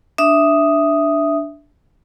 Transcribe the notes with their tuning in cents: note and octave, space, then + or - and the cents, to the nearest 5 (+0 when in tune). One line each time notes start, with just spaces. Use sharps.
D4 +0 E5 +0 D#6 +0